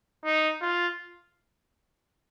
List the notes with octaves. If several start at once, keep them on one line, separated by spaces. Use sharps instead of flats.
D#4
F4